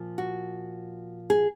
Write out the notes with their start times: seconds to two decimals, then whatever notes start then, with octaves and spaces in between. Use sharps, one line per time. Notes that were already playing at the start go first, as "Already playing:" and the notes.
Already playing: A#2 F3
0.18 F#4
1.30 G#4